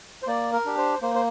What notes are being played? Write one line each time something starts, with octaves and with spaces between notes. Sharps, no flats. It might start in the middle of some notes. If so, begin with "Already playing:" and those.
C5
A#3 D5
A#4
D4 G4
C5
A#3 C5
C5